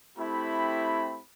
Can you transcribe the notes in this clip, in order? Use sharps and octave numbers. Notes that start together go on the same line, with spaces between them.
A3 C4 E4 G4 B5